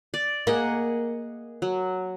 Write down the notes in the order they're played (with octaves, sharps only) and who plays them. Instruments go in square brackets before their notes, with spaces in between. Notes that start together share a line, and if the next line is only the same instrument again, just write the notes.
[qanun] D5
[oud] A#3 [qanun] G#4 D#5 F#5
[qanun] F#3